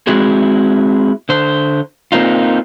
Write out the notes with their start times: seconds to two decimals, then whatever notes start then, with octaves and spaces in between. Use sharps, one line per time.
0.07 G#3 C4 E4 F#4 G#4
1.29 D3 C5
2.12 A#3 C4 D#4 F4